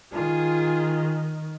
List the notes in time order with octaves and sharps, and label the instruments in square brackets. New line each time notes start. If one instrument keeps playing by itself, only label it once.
[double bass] D#3 [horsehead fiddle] F4 G#4